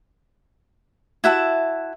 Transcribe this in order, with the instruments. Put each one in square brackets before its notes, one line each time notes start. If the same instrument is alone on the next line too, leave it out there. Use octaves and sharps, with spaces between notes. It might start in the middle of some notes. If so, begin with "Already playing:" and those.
[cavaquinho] E4 F#4 E5 A5